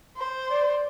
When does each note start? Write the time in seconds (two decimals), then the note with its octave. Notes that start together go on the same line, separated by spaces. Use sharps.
0.17 C5
0.51 D5